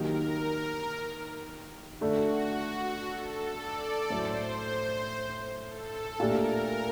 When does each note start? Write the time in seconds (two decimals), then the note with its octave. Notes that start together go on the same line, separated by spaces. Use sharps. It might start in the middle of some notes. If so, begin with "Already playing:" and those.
Already playing: D#3 F#3 A#3 D#4 G4 A#4
2.00 D3 A3 D4 F#4
3.06 A4
3.58 D5
4.10 A2 F#3 A3 C5
5.67 A4
6.20 A#2 A3 D4 G4 A#4